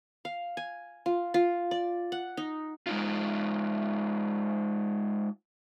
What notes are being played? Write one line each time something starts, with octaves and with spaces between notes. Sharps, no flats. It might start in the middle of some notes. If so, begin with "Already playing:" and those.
F5
G#5
F4
F4
D5
F#5
D#4
G#3 D#4 F4